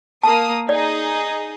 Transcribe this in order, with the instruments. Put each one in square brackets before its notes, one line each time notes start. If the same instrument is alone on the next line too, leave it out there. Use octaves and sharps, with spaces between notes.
[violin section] A#3 D#6 [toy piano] A5
[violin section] D#4 G#4 D#5 [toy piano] D5